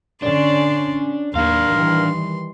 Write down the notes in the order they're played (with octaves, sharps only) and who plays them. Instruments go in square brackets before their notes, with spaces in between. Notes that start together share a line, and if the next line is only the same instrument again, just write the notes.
[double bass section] D3 C#4 [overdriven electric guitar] D4 [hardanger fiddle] D5 C6
[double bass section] D#2 [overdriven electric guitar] D4 F5 [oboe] A#4 [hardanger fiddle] C6
[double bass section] D#3 E3 G3